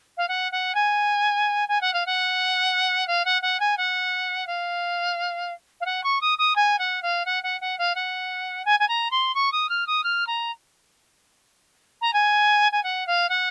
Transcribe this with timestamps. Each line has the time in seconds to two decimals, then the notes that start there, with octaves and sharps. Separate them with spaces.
0.17 F5
0.28 F#5
0.52 F#5
0.74 G#5
1.68 G#5
1.81 F#5
1.93 F5
2.06 F#5
3.07 F5
3.25 F#5
3.42 F#5
3.59 G#5
3.77 F#5
4.46 F5
5.80 F5
5.85 F#5
6.03 C#6
6.21 D#6
6.38 D#6
6.55 G#5
6.78 F#5
7.02 F5
7.25 F#5
7.43 F#5
7.61 F#5
7.78 F5
7.95 F#5
8.65 G#5
8.79 G#5
8.88 A#5
9.11 C6
9.34 C#6
9.52 D#6
9.69 F6
9.86 D#6
10.03 F6
10.26 A#5
12.01 A#5
12.13 G#5
12.72 G#5
12.83 F#5
13.06 F5
13.29 F#5